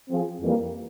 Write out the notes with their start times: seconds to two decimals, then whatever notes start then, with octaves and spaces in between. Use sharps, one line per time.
0.09 F3 C4 F4 G#4
0.41 F2 E3 G3 A#3